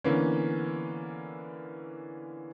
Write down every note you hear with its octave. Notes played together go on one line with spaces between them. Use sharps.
D3 E3 A#3 B3 C#4